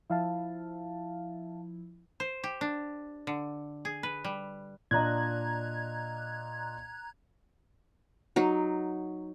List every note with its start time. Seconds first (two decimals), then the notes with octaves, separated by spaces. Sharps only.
0.10 F3 E4 E5 F5 A5
2.20 C5
2.44 G4
2.61 D4
3.27 D3
3.85 G#4
4.03 B4
4.24 G3
4.91 A#2 D4 D#5 A#5 F#6 G#6
8.36 F#3 D#4